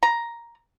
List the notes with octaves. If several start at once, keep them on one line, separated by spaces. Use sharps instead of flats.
A#5